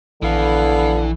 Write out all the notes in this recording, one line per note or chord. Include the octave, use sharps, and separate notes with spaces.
A#1 D3 E3 B3 A4 F5